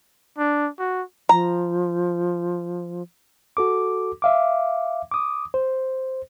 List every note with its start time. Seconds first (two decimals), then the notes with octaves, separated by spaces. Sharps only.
0.38 D4
0.79 F#4
1.29 F3 A#5
3.57 F#4 A4 D6
4.22 E5 F5 D6
5.11 D6 D#6
5.54 C5